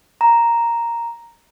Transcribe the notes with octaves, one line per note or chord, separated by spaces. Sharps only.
A#5